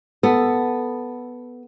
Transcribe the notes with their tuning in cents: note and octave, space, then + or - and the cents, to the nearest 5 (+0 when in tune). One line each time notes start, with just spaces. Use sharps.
B3 +0 A4 +0